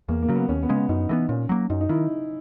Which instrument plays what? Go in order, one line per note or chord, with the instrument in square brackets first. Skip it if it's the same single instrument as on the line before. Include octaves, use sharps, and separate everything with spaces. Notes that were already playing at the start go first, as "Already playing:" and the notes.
[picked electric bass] E2 [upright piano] A#3
[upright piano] A#3
[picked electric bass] C#3 F#3
[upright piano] B3
[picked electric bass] D#2 [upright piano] C#4
[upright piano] B3
[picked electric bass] C#3 G#3
[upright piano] B3
[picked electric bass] F#2 [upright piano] D#4
[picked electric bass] E3 G#3 B3
[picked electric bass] A#2 [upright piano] C#4
[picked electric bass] F#3 A#3
[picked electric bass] F#2 [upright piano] D#4
[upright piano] D#4
[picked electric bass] D#3 [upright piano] E4